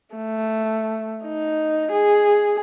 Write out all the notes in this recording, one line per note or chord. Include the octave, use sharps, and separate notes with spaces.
A3
D#4
G#4